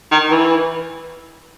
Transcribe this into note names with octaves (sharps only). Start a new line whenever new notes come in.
D#3
E3